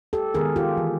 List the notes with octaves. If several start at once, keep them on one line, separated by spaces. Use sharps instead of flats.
G4 A4
D#3 G#3 B3 G#4 A#4
F4 G4
E3